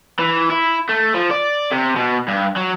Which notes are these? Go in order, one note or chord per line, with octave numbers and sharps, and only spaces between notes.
E3
E4
A3
F3
D5
C3
B2
G2
F#3